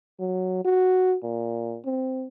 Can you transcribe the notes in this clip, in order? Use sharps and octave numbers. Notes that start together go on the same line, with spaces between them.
F#3
F#4
A#2
C4